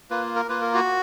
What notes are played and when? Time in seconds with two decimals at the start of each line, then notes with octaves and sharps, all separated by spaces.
0.10 A#3 F4 B4
0.36 A#4
0.49 A#3 F4 B4
0.61 A#4
0.74 F#4